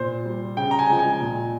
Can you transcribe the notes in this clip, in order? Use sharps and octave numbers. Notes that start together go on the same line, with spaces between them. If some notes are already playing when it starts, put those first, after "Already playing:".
Already playing: A#2 C5
G3
C#3 G5
A#5
G#5
F3 G#3
G#5
A#2